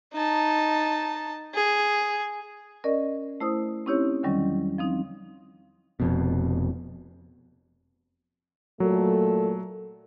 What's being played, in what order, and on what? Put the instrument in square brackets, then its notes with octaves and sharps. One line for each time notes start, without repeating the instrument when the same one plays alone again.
[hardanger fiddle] D#4 A5
G#4
[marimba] C#4 A#4 D5 D#5
A3 E4 C5 D#6
C4 C#4 D#4 E4 G4 C#5
E2 D3 D#3 F#3 G3 C#4
F3 C4 D#4
[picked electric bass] F1 F2 B2
[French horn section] A#2 A3 A4 [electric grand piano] F#3